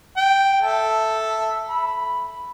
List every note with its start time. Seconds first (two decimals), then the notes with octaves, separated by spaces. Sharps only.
0.17 G5
0.62 A4 E5 A5
1.69 B5